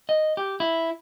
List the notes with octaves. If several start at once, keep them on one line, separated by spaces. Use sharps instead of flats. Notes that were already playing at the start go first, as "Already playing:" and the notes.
D#5
G4
E4